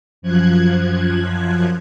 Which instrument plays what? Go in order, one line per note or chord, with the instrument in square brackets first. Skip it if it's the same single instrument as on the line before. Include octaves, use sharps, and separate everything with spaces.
[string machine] F#2 F3 F#6 G#6